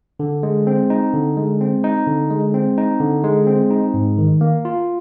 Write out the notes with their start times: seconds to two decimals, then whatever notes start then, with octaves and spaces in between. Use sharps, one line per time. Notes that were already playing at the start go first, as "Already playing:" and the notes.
0.20 D3
0.43 G#3
0.67 C4
0.90 D#4
1.13 D3
1.37 G#3
1.61 C4
1.84 D#4
2.07 D3
2.30 G#3
2.54 C4
2.78 D#4
3.01 D3
3.24 G#3
3.47 C4
3.71 D#4
3.94 G#2
4.18 D#3
4.41 A#3
4.65 F4